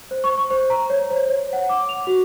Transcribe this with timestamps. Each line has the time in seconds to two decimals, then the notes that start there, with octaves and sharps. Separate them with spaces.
0.11 C5
0.24 C#6
0.38 C#6
0.50 C5
0.70 A#5
0.90 C#5
1.10 C5
1.29 C#5
1.53 F#5
1.69 D6
1.89 F7
2.07 F#4